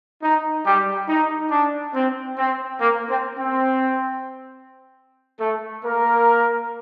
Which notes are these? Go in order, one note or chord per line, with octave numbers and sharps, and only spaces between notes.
D#4
G3 G4
D#4
D4
C4
C4
A#3
C4
C4
A3 A4
A#3 A#4